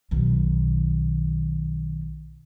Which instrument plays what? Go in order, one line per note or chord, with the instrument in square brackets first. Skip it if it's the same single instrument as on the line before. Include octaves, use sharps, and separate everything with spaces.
[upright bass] B1 D#3